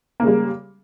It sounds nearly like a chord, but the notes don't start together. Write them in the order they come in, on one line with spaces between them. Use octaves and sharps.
A#3 C#3 G#3 G3